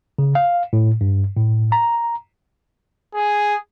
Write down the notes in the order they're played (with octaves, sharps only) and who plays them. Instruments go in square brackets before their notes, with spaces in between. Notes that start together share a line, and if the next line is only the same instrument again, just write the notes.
[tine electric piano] C#3
F5
A2
G2
A2
A#5
[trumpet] G#4